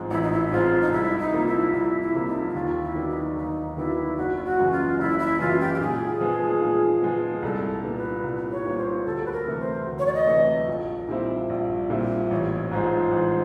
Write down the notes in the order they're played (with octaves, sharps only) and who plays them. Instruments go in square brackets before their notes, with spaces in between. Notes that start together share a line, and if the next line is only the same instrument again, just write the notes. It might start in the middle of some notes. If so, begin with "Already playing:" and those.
Already playing: [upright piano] A1 G#2 F3 G#3 C4
[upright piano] A1 [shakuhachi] E4
[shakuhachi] D#4
E4
E4
[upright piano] G#2 F3 G#3 C4 [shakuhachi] F4
[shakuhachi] D#4
[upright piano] C2 [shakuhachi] E4
[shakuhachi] D#4
[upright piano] C3 F3 A#3
[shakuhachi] E4
[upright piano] C2 [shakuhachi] E4
[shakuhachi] E4
[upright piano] C3 F3 A#3
[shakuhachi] D#4
E4
[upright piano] D#2 [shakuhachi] F4
[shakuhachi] E4
[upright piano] D#3 F#3 B3 D4
[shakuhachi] D#4
[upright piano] D#2 [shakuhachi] D#4
[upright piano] D#3 F#3 B3 D4 [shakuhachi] E4
[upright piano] F#1 [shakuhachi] F#4
[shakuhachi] F4
F#4
[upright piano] F#2 C#3 E3 G#3
[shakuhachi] F4
[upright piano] F#1 [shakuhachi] E4
[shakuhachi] E4
[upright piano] F#2 C#3 E3 G#3 [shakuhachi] F4
[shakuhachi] G4
G4
[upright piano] A#2 [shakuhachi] G#4
[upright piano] F3 G#3 B3
A#2
F3 G#3 B3
[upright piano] C2 [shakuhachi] A4
[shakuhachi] A4
[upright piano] A#2 G3 B3
[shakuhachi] B4
[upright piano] C2
[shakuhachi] C#5
[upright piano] A#2 G3 B3
[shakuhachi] C5
[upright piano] D2 [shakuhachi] A4
[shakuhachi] B4
A#4
[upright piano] C3 E3 A3
[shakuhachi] C5
[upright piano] D2
[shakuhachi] C#5
D5
D#5
[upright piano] C3 E3 A3
A#1
A#2 G3 C4 E4
A#1
A#2 G3 C4 E4
[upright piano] A1 [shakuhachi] C#5
[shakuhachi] C#5
[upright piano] G#2 F3 G#3 [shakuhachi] C5
[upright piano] A1